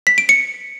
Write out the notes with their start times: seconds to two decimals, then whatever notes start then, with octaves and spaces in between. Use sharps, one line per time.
0.07 B6
0.18 D7
0.29 C#7